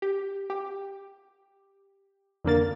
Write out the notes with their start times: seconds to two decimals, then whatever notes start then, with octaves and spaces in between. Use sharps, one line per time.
0.02 G4
0.50 G4
2.44 F2 D3 A#3 A6